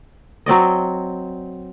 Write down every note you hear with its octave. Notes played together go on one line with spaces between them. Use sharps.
F#3 C4 D5 D#5